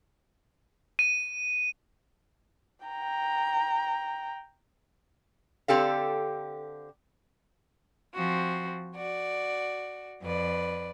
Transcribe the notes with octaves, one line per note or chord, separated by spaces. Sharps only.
D#7
G5 A#5
D3 C4 G4 A4 F5
F3 C4 F#4
F#4 D5
F2 B4 D5